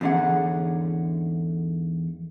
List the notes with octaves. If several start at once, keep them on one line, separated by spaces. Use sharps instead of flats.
E2 G#2 D3 C#4 F#5